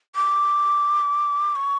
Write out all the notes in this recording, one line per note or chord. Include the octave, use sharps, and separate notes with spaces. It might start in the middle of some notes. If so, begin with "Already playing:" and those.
D6
C#6